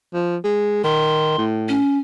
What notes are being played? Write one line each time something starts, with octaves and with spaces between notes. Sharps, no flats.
F3
G#3
D#3 C6
A2
C#4